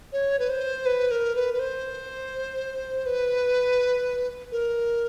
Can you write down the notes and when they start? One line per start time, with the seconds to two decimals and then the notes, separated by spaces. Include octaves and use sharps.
0.13 C#5
0.39 B4
0.50 C5
0.86 B4
1.11 A#4
1.35 B4
1.54 B4
1.59 C5
3.06 B4
4.52 A#4